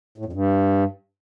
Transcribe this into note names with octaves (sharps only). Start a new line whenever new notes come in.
A2
F2
G2